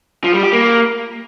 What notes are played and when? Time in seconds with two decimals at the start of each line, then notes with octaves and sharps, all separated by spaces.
0.24 F3
0.34 G3
0.43 G4
0.53 A#3